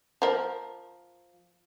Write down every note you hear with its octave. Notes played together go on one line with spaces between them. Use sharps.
F3 A#4